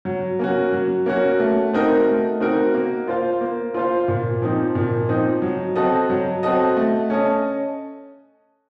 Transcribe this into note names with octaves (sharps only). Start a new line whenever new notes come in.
F#3
A#3 C#4 F#4
F#3
A#3 C#4 F#4
A3
C4 D#4 F#4 A#4
A3
C4 D#4 F#4 A#4
A#3
F4 C5 F5
A#3
F4 C5 F5
A#2
F3 C4 D#4
A#2
F3 C4 D#4
F#3
C4 F#4 A4 D#5
F#3
C4 F#4 A4 D#5
A3
C#4 A4 D#5